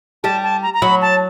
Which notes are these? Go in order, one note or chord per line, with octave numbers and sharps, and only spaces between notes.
G3 G4 A5
A5
A#5
A#5
F#3 F#4 B5
A5